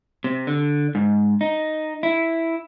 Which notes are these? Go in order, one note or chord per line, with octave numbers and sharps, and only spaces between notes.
C3
D3
G#2
D#4
E4